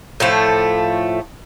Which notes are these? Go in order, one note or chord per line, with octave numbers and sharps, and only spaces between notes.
A2 F3 A3